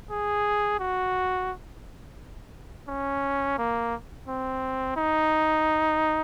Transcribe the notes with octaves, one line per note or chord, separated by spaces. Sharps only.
G#4
F#4
C#4
A#3
C4
D#4